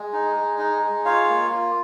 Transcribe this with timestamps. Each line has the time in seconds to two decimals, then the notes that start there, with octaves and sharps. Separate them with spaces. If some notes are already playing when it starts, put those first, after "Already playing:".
Already playing: G#3
0.13 D#4
0.36 G#3
0.59 D#4
0.82 G#3
1.05 F4 C#5 F5
1.29 A#3
1.51 F4